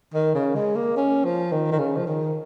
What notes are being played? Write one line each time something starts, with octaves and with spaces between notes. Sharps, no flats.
D#3
C#3
G#3
A#3
C#4
F3
D#3
D#3
C#3
F3
D#3